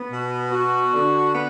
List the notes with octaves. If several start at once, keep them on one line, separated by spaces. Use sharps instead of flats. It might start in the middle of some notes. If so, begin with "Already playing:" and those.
Already playing: B3
B2
F#4
D3
B3